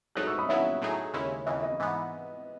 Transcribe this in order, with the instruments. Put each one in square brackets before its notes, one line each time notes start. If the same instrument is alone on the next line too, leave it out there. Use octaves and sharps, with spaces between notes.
[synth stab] A1 G#2 F#3 A3 D#4 [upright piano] D#6 F#6
[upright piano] C#6 E6
B5 D#6
[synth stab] D#2 C#3 F#3 B3 E4 [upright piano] C#5 E5
[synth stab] A2 F#3 A3 D#4 G#4
D#2 C#3 G#3 C#4 E4
[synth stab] D#2 C#3 E3 [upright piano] D#5
[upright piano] D#5
[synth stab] G#2 E3 B3